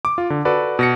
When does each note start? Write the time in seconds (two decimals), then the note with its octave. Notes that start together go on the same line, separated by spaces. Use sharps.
0.05 D6
0.18 F4
0.30 D3
0.45 F#4 A4 B4 D5
0.79 B2 A#6 C#7